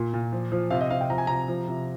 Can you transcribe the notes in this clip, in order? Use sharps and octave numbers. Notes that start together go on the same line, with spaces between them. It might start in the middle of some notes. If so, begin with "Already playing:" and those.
Already playing: A#2
A#2
F3
F3
C3 F5
D#5
C3 F5
G5
F3 A#5
G#5
C3 A#5
F3
C3